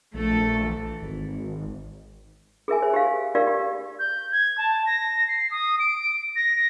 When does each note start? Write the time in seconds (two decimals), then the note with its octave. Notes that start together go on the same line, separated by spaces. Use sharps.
0.14 A#1 A3 A4
0.59 E3
1.02 G#1
2.68 G#4 A#4 E5 G#5
2.82 C5
2.94 G4 F5
3.35 G4 A#4 D5 F5
3.47 G4
3.99 G6
4.32 G#6
4.58 A5
4.86 A#6
5.28 C7
5.51 D#6
5.79 D7
6.36 A#6